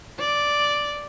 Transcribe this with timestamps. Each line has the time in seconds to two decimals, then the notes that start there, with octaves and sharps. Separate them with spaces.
0.20 D5